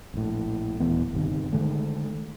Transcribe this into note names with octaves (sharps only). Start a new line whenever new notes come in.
A#1 A2
D#1 E2 E3 B3
G1 C3 D#3
D3 D#3 G#3 A3